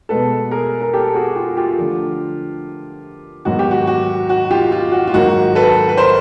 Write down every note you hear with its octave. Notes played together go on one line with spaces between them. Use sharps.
B2 G#3 B3 A4 B4
G#4 A#4
A#4
G4 A4
F#4 G#4
F4 G4
F4 G4
D3 F3 A3
G#2 D#3 F#3 B3 F#4
G4
F#4
F#4
F#4
F4 G4
F4
F#4
F4
G#2 D#3 F#3 A#3 F#4
A4 B4
B4
A#4 C5